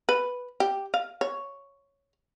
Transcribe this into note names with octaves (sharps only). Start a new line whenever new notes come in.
B4
G4
F5
C#5